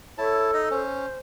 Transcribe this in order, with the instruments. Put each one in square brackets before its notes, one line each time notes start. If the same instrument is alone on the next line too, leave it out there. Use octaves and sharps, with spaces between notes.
[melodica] E4 A5 [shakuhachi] A4 [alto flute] C#5
[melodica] D#4 D#5
[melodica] C#4 [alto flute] C5